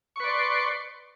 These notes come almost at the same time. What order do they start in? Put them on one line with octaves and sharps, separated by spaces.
C#6 B4 D5 C6